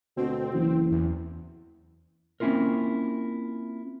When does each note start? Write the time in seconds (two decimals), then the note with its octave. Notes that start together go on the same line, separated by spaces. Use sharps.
0.17 D2 B2 C4
0.54 F#1 E3
0.92 E2
2.40 A#3 C4 C#4 E4 F4 A#4